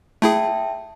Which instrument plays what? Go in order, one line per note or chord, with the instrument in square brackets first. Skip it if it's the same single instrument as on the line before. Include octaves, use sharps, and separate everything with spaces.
[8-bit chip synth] A3 E4 G#4 [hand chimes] E5 G5 A5